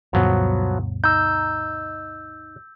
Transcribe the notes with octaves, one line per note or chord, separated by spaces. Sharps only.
D2 G2 B2 F3 F#3 B3
D#4 E6 G6